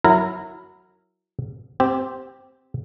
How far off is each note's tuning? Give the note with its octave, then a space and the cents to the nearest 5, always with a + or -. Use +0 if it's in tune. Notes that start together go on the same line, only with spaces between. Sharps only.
F#3 +0 E4 +0 A#4 -15
C4 +0 G4 +0